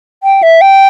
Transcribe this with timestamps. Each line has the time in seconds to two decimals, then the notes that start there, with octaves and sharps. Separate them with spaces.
0.23 G5
0.43 E5
0.61 G5